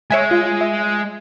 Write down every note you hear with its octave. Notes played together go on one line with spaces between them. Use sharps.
G#3 C#5 E5 G#5
F4
E5